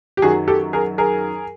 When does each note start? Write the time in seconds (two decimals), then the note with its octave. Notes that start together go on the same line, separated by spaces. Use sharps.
0.17 G4
0.22 F#2 D#3 F#3 F#4 G#4
0.48 G4 A4
0.73 G#4 A#4
0.98 G#4 A#4